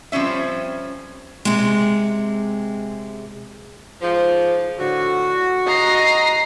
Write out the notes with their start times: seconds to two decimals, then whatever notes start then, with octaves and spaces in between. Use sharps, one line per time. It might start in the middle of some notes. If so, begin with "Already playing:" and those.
0.12 F3 G3 C4 C#4 E5
1.45 C3 G#3
4.02 G#2 F3
4.79 A2 D3 F#4
5.67 D#5 A#5 C7